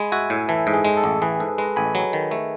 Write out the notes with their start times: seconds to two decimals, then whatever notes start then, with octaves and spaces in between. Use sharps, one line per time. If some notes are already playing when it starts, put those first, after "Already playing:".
Already playing: G#3 G#5 B5
0.12 F#4 E5 G#5
0.30 A2
0.49 E3 A4
0.67 G#2
0.73 G#4
0.85 G#3
0.97 A4
1.04 A1
1.22 E3 G#4 B4
1.40 G#2 A4
1.58 G#3 B4 D#5
1.76 A1 G#5 B5
1.95 F#3
2.13 D#3
2.31 A3